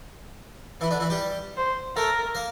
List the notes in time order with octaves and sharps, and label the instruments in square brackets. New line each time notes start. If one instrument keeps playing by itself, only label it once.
[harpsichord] E3 E4 [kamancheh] B4
[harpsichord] D3 D4
E3 E4
G3 G4
[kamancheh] C5
[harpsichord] A3 A4 [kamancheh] A#4
[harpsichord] A#3 A#4